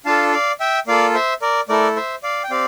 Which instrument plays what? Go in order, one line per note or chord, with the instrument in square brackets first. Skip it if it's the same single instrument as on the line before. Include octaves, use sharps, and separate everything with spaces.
[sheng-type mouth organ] D4 F4 A4 F5 A5
D5 F5
E5 G5
A#3 F4 A4 D5 F5
C5 E5
A#4 D5
A3 E4 A4 A#4 D5
C5 E5
D5 F5
G5
C4 G4 D5 F5